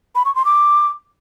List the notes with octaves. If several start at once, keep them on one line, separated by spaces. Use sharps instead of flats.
B5
C#6
C6
D6